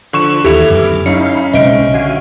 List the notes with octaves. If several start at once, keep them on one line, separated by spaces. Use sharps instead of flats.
D3 F3 C#6 E7
D#2 E3 E4 G4 A4 F7
F#2 D3 B3 D6 F6
F#3 C#4 D#4 E4 F5 C#7
B1 C#3 G#3 C4 D#5 E5 D7
D3 F#4 F5 G#5